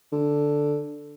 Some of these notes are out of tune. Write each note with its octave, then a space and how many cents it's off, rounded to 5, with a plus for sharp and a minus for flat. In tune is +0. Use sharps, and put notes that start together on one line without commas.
D3 +0